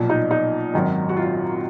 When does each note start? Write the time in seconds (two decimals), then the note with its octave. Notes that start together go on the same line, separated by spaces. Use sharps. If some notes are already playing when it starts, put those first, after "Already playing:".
Already playing: B1 A#2 F3
0.09 D#4
0.31 D#4
0.74 G#1 F#2 D#3 F#3
1.09 F#4
1.17 F4